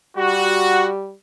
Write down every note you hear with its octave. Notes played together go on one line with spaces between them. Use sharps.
G3 F#4